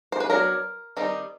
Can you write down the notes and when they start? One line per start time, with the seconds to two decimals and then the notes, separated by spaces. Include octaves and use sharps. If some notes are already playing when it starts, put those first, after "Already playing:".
0.12 C5
0.20 B4
0.30 F#3 B3 D4 A#4
0.97 D#3 G3 C4 D#4